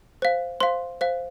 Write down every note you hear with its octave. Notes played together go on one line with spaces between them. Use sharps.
C5 F5
C5 F5 C6
C5 F5